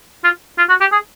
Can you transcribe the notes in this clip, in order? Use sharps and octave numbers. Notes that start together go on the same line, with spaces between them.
F4
F4
F#4
G4
G#4